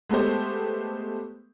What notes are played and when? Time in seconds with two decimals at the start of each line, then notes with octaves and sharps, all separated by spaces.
0.09 G#3 A3 B3 G4 C5